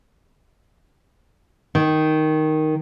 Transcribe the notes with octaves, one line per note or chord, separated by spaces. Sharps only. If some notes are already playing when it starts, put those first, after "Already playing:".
D#3